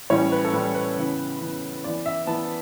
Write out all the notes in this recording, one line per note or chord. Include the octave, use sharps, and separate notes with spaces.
A2 E3 G3 C#4 C#5
B4
A4
A2 E3 G3 C#4 B4
B4
C#3 E3 B3
C#3 E3 B3
E3 B3 D5
E5
E3 B3 A5